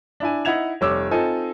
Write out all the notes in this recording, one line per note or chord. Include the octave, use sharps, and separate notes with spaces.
D4 E4 G#5
D#4 E4 F#5 G#6 F7
F1 G3 C#5 D6 E6
C4 D#4 F4 A4 G#5